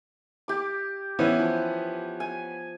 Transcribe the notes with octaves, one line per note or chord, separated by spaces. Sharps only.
G4 D6
E3 B3 C#4
F3
G#5